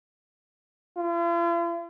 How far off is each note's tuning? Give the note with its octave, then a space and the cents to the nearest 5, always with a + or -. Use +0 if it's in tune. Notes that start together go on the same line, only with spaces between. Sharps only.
F4 -45